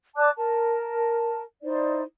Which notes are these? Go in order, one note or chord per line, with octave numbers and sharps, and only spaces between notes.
D5 A5 D6 F#6
A#4 A5
D#4 E4 C5 D5